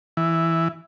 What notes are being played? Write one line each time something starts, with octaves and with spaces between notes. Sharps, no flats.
E3